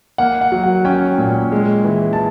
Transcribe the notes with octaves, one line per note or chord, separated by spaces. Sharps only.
A#3 F#5
F#5
F#3
F#5
C#4 G5
A#2
G#3
E3
A5